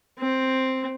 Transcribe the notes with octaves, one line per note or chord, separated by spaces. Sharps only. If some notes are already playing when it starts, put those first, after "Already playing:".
C4